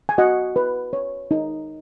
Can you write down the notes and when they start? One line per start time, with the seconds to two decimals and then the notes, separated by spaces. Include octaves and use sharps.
0.09 G#5
0.18 F#4 D#5 F#5
0.56 B4
0.93 C#5
1.31 D#4